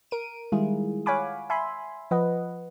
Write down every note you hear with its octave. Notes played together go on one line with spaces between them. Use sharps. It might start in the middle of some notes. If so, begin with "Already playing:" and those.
A#4 D7 D#7
D#3 G3 G#3 E4 F4 G#4
C#5 F5 F#5 G#5 B5 D6
E5 G#5 B5 C6
F3 B4 D#5 F#5